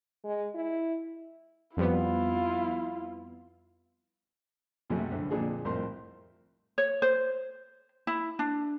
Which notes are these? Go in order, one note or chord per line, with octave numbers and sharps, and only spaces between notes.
G#3
E4
F2 G3 B3 E4 F4
C#2 F#2 C3 F#3 G#3 A3
C2 G2 D3
F2 A#2 D3 D4 G#4
C2 F2 A2 A#4 C5 C6
C#5
C5
E4
D4